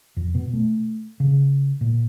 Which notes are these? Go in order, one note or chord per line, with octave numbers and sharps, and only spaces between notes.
F2
B2
A3
C#3
A#2